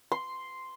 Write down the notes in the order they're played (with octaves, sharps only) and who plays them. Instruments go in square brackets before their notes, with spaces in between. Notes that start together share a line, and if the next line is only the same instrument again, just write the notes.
[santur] C6